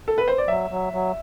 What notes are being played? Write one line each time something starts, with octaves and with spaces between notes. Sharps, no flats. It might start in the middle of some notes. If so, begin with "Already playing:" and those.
A4
B4
C5
D5
F#3 E5
F#3
F#3